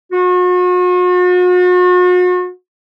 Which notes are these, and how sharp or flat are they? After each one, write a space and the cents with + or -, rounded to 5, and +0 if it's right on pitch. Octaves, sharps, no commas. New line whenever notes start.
F#4 -40